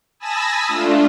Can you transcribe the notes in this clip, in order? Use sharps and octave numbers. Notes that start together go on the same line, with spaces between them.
G#5 A5 B5 D#6 E6 A#6
A3 D4 F4